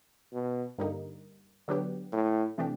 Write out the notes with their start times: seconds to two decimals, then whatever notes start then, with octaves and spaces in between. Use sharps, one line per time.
0.33 B2
0.78 G2 D3 G3 A#3 D#4
1.68 D3 F#3 B3 D4 G4
2.13 A2
2.58 C3 E3 A3 D4 G4